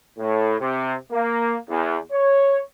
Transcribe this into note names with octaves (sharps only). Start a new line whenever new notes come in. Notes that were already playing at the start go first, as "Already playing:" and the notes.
A2
C3
A#3
E2
C#5